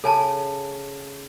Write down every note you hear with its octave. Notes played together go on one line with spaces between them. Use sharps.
C#3 A4 G#5 A5